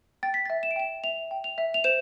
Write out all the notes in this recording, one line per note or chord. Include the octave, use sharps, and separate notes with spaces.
G5 A6
B6
E5 A6
E7
D7
G5 E7
E5 F7
G5
F7
E5
F7
C5 E7